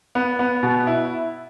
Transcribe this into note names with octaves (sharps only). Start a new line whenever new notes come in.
B3
B3
B2
E4